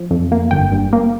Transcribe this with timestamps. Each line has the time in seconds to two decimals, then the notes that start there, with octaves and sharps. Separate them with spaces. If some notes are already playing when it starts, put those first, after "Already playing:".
Already playing: F3
0.11 F2
0.32 A#3
0.51 G1 G5
0.72 G2
0.93 A#3